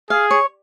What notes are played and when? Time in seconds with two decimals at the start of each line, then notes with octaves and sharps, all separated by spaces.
0.10 G#4 F5
0.31 C#5